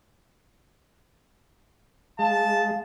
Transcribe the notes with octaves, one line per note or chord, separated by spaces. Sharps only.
G#3 F5 A5